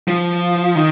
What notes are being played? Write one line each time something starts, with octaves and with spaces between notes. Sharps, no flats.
F3
D#3